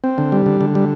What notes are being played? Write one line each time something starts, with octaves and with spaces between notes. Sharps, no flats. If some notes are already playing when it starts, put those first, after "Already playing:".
C4
D3
G3
D3
D3
G3